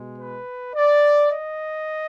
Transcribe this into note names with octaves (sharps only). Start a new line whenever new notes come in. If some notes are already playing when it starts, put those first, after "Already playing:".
Already playing: B2 G#3
B4
D5
D#5